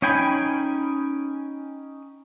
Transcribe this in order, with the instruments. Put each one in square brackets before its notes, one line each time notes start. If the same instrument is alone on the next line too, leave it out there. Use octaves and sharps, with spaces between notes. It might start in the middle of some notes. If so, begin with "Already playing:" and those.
[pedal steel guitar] C#4 D#4 G5 G#5 B5